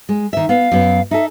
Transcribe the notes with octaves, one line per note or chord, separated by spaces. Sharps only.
G#3
D#3 E5
B3 F5
F#2 B3
D#4 A4 E5